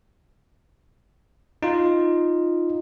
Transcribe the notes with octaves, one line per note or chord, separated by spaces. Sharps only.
D#4 F4